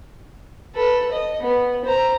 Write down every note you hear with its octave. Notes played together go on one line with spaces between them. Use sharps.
A4 B4
D#5
B3
C5 A#5